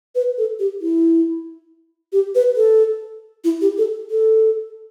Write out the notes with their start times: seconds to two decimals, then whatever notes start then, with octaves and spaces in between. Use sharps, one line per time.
0.15 B4
0.38 A4
0.59 G4
0.81 E4
2.13 G4
2.35 B4
2.56 A4
3.44 E4
3.61 G4
3.78 A4
4.10 A4